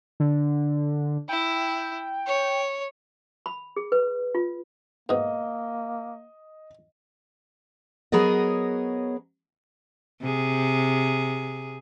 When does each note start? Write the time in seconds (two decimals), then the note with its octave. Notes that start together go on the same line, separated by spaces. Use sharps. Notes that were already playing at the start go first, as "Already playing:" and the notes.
0.20 D3
1.29 E4 G5
2.27 C#5
3.46 B5
3.76 G#4
3.92 B4
4.35 F4
5.09 G#2 B2 A#3 D#5
8.12 F#3 B3 G#4 A#4 C#5 D#5
10.21 C3 G#4